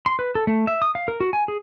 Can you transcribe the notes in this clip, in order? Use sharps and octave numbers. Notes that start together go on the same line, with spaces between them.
C6
B4
A4
A3
E5
D#6
F5
A#4
F#4
G#5
G#4